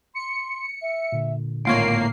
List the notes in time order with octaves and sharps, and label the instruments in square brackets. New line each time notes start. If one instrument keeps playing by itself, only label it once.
[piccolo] C6 [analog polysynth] C#7
[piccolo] E5
[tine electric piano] A#2 D3
[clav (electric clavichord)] G#1 F4 C#5 [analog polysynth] A2 A#3 C7 [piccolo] D7